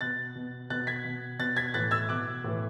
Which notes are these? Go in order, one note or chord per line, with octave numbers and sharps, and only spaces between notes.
B2 F#6 A6
B2
B2 F#6 A6
G#6 B6
B2
B2 F#6 A6
G#6 B6
A2 E3 F#6 A6
E6 G#6
B2 D6 F#6
A2 E3